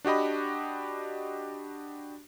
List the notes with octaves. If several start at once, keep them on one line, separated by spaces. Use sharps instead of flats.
D4 F#4 G4 D#5 B5